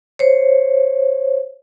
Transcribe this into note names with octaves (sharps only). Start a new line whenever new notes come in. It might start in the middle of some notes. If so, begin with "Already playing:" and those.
C5 C#5